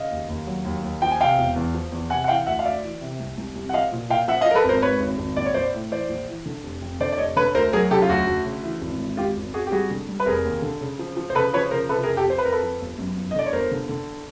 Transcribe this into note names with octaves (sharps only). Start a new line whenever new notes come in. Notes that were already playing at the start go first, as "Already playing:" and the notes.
Already playing: C#3 D#5 F5
D#2
D#2
F#3
D#2
D#2
F3 G5
G#5
C3 F5 G5
E1
E2
F3
E2
C3 F#5 G#5
F#5
E3 F5 G5
D2 E5 F#5
F5
D2 D5 E5
E3
C3
C2
C2
C2
F#5
F3 D#5 F5
A#2
A#2 F5 G5
F3 E5 F#5
D#5 F5
F3 A#4
A4 B4
G#1 A#4 C5
G#2 B4 C#5
G#1
G#1
A#1 D5
C#5
A#1 C5 D5
A2
E3 C5 D5
A#1
E3
D3
F1
F2
D3 C5 D5
D5
F1 C#5 D#5
D3 B4 C#5
D2 A#4 C5
F#3 G#4 A#4
C#3 G4 A4
F4
D2 F#4
D2
C#3
E3
G#1
G#2
G#1 F4 G4
G#1
G#1 F#4 G#4
G4
G3 F#4 G#4
D3
G3
B4
F1 G#4 A#4
D#2
D3
C#3
F3
F3
C5
C#3 A4 B4
F3 B4 C#5
C#3 A#4 C5
C3 A4 B4
G#4 A#4
F2
G4 A4
F3 C5
B4
F2 A#4
A4 B4
F3
G1
F#2
G1
D#5
D3 D5
C#5
G1 A#4 C5
D3
D3